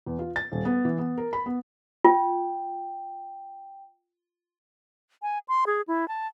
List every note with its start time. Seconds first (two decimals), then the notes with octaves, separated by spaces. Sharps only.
0.06 E2
0.19 F4
0.36 A6
0.52 D#1
0.65 B3
0.85 E3
0.98 B3
1.18 A#4
1.33 B5
1.46 B3
2.05 F4 G5
5.22 G#5
5.48 C6
5.67 G#4
5.88 E4
6.08 A5